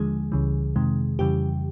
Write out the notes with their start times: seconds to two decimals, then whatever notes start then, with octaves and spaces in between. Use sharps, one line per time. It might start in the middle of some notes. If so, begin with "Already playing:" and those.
Already playing: D#2 D3 F3 G#3 G#4
0.32 C#2 C#3 E3 G3
0.75 F2 C3 D#3 G#3
1.19 F2 C#3 E3 G3 G4